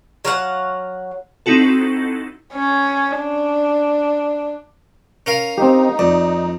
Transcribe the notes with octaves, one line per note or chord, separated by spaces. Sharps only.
F#3 F5 F#5
C4 D#4 E4 F#4 A4
C#4
D4
C#4 A#4 F5
C4 D#4 G4
F2 D5